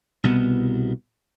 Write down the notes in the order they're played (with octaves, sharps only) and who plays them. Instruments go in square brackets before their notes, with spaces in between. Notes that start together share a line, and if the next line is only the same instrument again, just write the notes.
[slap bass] C2 B2 B3